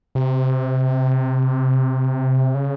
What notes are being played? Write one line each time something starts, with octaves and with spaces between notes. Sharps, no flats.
C3
C#3